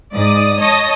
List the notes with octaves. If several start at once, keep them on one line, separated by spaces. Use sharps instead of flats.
G#2 D5 D#6
C#5 D#5 A5 D#6 A#6